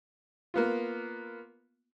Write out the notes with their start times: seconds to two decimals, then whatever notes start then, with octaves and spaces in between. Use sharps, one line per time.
0.54 A#3 B3 F4